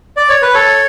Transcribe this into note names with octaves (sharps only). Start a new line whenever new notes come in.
D5
C#5
B4
A4 C#5